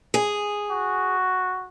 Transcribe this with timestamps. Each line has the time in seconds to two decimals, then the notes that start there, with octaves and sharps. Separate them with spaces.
0.14 G#4
0.70 F#4